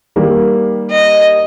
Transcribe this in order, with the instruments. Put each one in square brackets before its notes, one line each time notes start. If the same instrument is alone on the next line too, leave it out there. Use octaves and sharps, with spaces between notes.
[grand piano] D#3 G3 A#3
[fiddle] D#5